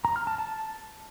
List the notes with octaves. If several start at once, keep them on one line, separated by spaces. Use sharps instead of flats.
A#5
F6
A5
A5